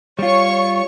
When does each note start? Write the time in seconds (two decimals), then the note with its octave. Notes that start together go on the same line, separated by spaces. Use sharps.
0.19 G3 F4 C#5 C#6